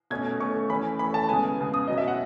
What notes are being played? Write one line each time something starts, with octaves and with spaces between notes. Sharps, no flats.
B2 A3 C#4 G#6
B2 A3 C#4 C#6
E3 A3 C#4 B5
E3 A3 C#4 B5
A5
C#3 G#3 B3 G#5
C#3 G#3 B3
D#6
B2 F#3 C#4 D#5
E5
F#5